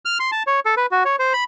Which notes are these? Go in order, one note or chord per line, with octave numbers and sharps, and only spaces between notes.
F6
C6
A5
C#5
A4
B4
F#4
C#5
C5
B5